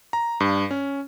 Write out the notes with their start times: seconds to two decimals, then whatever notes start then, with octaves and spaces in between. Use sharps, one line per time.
0.13 A#5
0.40 G2
0.71 C#4